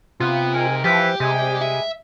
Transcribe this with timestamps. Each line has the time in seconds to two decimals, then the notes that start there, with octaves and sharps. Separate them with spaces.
0.20 C3 B3 F4
0.53 G#2 A#4 G#5
0.84 E3 F3 G4 B6
1.20 C3 G3 G#3 G#5
1.61 E5